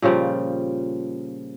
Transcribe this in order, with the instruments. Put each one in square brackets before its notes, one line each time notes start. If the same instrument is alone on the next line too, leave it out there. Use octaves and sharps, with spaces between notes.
[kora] A#2 C#3 F3 G3